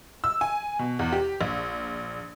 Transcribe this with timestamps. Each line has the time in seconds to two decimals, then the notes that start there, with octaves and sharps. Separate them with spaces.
0.24 E6
0.41 G#5
0.79 B2
0.99 E2
1.12 G4
1.41 A#1